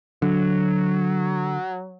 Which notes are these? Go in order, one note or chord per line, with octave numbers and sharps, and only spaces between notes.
D3 F#3